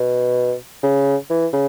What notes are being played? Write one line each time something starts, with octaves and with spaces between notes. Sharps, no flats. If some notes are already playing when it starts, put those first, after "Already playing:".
Already playing: B2
C#3
E3
C#3